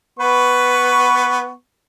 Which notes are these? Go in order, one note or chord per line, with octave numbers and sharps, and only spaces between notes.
B3 B4 C#6